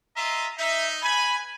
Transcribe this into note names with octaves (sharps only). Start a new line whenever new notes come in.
F4 D#5 E5 A#5
D#4 E5
B4 G#5 B5